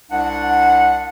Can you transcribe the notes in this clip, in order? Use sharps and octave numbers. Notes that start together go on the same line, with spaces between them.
C2 D4 F#5